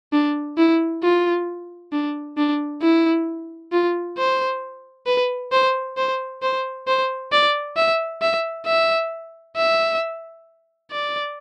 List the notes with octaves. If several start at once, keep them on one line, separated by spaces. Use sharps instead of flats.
D4
E4
F4
D4
D4
E4
F4
C5
B4
C5
C5
C5
C5
D5
E5
E5
E5
E5
D5